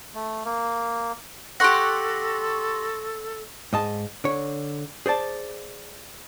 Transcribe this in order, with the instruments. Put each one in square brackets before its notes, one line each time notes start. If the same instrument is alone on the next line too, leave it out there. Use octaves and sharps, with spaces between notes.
[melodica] A3
A#3
[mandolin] G4 F#5 [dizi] A4 [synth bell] C6 C#6 A#6
[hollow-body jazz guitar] G#2 D#5 A5
D3 C#5
G#4 C5 D5 A5